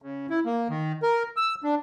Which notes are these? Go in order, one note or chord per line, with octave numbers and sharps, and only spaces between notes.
C#3
E4
A#3
D#3
A#4
E6
D4